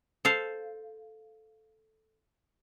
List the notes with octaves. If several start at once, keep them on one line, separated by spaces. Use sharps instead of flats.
A4 C5 F5